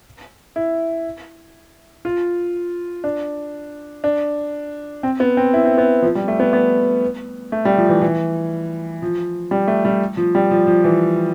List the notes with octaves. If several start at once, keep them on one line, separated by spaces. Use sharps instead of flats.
E4
F4
D4
D4
C4
B3
C4
E4
C4
B3
F3
G3
A3
B3
B3
A3
G3
F3
E3
E3
F3
G3
A3
G3
F3
G3
F3
F3
E3